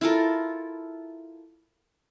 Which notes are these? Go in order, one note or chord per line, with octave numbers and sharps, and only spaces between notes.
E4 F4 A4 A#4